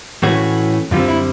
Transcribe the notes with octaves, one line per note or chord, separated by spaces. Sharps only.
A2 E3 A3 C#4 F#4
F#2 D3 G3 C4 F4
E4